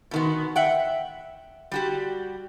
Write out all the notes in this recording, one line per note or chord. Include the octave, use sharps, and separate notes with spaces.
B2 D#3 B3
E5 F#5 G5
G3 F#4 G4